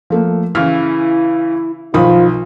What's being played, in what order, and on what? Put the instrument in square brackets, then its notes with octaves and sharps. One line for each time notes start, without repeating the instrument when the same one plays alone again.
[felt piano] F3 A3 A#3
[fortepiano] C#3 E3 [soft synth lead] E4 [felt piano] F6
[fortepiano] B1 [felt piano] D#3 B5 D#6 [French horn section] F3 F4